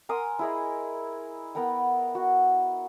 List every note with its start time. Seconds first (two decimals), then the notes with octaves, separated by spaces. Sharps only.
0.09 A#4 G#5 C6 D#6
0.39 E4 G#4 D#5
1.55 B3 A#4 F#5 G5
2.15 F#4